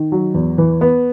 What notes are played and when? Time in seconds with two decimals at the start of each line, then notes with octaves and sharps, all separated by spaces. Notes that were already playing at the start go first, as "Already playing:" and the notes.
Already playing: D#3
0.12 F#3
0.34 E2
0.58 E3
0.81 B3